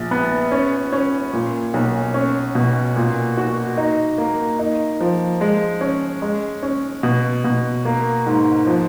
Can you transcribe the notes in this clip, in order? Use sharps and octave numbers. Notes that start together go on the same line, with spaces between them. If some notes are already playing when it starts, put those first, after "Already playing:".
Already playing: A#1
B3
C#4
C#4
A#2
B1
C#4
B2
A#2
F#4
D#4
A#3
D#4
F3
G#3
C#4
G#3
C#4
B2
B2
A#3
G#2
F3